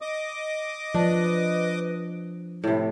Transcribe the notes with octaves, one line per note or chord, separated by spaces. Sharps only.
D#5 D6 D#6
F3 D4 B4
A2 C3 E4